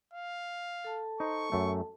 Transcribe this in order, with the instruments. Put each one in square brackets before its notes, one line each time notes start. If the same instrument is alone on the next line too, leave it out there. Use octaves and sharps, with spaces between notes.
[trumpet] F5
[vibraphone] A4 A5
[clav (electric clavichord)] D#4 C5 [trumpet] C#6
[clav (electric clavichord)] F#2 A3